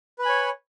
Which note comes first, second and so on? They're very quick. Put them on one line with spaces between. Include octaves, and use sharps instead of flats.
B4 B5 G#5 C#5